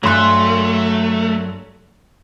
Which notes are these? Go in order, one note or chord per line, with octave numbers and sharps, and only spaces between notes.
G2 F#3 A3 G#5 C6 F#6